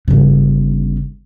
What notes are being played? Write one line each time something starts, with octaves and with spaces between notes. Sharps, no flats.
G1 C#3